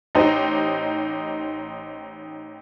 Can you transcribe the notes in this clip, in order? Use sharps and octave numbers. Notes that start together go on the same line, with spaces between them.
A1 D#4 G4 C5